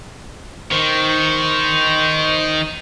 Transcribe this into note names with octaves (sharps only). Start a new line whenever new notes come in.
D#3 C5 C#6